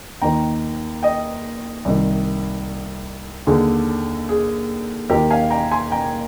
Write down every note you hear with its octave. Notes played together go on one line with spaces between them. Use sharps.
D#2 D#3 G5 A#5
D#5 G5
C2 C3 D#3
D#2 D3 G#4
G#4
D#2 D#3 G4 A#4
F5 G#5
G5 A#5
G#5 C6
G5 A#5